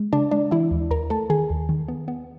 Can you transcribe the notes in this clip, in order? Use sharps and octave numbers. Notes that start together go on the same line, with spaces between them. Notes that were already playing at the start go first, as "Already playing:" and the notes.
Already playing: G#3
C#3 D4 D5
G#3 D4 D5
E3 E4 E5
D#2
D#2 A#4 A#5
A3 A4 A5
D#3 G#4 G#5
D#2
D#3
B3
B3